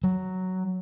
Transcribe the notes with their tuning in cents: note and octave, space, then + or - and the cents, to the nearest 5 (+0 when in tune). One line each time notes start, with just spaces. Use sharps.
F#3 +5